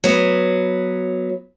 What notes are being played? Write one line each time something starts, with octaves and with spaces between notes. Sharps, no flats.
F#3 B3